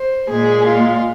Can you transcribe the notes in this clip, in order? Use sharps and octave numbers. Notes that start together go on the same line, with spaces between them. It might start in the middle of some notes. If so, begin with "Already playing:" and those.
Already playing: C5
A#2 G#3 G#4
F4